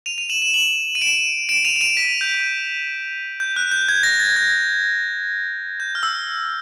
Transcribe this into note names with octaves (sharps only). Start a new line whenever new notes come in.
D#7 F7
D#7 F7
E7 F#7
E7 F#7
E7 F#7
D#7
D7 E7
D7 E7
D#7 F7
E7
D#7 F7
B6
G6
G6
F#6
G6
G#6
A#6
A6
G#6
G6
F6
E6